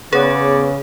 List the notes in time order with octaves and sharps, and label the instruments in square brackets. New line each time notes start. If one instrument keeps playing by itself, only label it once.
[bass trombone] C#3 [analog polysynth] B3 B4 [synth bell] G#4 [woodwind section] C#5 D5